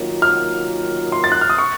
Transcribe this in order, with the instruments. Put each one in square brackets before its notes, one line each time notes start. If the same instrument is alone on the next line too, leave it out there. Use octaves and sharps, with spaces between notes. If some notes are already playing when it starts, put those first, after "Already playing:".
Already playing: [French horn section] D#3 F#3 A#3 F4
[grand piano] F6
C6
A6
F#6
F6
D#6
C#6